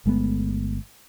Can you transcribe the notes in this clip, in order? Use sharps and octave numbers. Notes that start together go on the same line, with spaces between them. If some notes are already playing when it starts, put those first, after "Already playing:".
G1 G#3 A3 B3